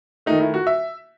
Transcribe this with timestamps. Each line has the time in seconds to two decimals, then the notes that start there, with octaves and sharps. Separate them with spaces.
0.26 D#3 A3 D#4
0.40 E4
0.54 F#4
0.67 E5